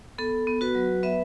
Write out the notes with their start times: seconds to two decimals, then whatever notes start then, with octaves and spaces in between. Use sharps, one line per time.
0.18 B3 A4
0.47 B3
0.61 F#4 B4
0.75 F#3
1.03 B3 B4 E5